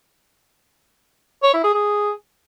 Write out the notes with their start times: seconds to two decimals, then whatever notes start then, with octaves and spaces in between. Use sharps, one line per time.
1.43 C#5
1.54 E4
1.64 G#4
1.74 G#4